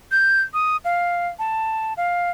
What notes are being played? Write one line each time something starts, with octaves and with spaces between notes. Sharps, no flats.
G6
D#6
F5
A5
F5